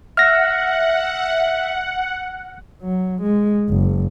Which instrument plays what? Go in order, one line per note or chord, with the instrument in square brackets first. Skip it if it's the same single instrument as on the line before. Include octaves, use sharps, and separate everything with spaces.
[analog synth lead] E5 [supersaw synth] F#5 [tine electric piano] F6 A#6
[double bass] F#3
G#3
F#1